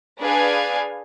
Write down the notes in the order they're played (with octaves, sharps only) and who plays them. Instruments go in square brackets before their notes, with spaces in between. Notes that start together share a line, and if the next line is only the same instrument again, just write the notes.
[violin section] D4 G#4 B4 F5 G#5